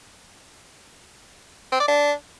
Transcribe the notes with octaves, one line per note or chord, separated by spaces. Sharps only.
C4
D5
D4